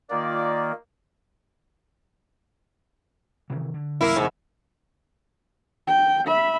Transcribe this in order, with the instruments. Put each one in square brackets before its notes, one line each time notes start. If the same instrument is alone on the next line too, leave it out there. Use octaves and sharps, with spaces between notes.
[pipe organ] D#3 A#3 [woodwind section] F4 D5
[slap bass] C3 D#3 E3
D3
[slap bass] C2 F#2 [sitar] A#3 E4
[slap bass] E2 C3 E3 [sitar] G#2
[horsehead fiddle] G5
E5 B5